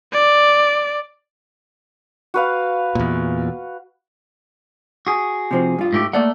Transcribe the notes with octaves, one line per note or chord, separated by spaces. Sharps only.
D5
F#4 B4 F5
E2 A#2
F#4 G#4
C3 F3 C4
G2 F4
G#2 A3 G4
A3 A#3 D5 F#5